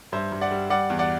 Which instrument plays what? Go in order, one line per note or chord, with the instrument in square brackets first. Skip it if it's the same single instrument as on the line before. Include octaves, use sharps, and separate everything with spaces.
[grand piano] G2 C5 E5
G2
D5 F#5
G3
G3 D5 F#5
E2
D5 F#5